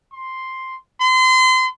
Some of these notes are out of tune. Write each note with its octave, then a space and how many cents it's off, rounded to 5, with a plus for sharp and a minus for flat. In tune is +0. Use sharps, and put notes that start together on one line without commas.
C6 +0
C6 -30